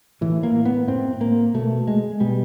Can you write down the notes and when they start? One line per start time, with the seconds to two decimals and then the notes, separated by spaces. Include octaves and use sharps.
0.21 A2 E3
0.43 A#3
0.65 B3
0.87 A2 C4
1.21 A#3
1.54 B2 A3
1.87 G#3
2.20 B2 G3